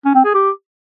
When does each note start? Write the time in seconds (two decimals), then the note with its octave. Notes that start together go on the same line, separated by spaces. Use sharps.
0.05 C#4
0.15 C4
0.24 G#4
0.34 G4